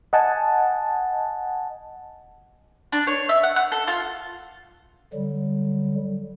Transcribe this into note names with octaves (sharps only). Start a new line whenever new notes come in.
D#5 F#5 G#5 A5
D4
C#5
E5
F#5
F#5
A4
F4
D3 F#3 G3